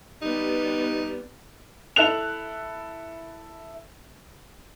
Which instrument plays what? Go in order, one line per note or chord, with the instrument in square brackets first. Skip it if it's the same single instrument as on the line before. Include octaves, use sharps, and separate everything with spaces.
[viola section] G3 B3 [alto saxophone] D#4
[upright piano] E4 A4 F#6 F7